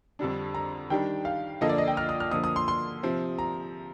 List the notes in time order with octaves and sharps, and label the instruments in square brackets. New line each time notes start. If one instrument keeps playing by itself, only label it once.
[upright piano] F2 D3 G3 D4
[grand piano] A#5
[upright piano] D#3 G3 D4 [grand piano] G5
[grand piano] F5
[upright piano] D3 F3 A#3 F4 A4 [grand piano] D#5
[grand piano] D5
D#5
G5
F6
D#6
F6
[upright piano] D3 F3 A#3 [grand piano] D#6
[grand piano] D#6
C6
C6
[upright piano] C3 F3 C4
[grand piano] A#5